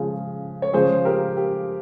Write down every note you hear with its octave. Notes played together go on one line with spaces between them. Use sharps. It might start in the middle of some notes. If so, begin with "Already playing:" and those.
Already playing: C#3 F3 G#3
C#5
C#3 F3 G#3 G#4 C5
G4 A#4
G4